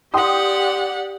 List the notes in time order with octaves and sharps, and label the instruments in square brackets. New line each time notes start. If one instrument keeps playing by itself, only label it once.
[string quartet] G4 D5 F#5 [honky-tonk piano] G5 C6 D#6